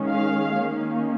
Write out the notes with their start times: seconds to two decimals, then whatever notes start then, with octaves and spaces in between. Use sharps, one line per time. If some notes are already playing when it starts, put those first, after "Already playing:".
Already playing: D#3 G#3 C#4
0.09 F5
0.58 D#3 A#3 C#4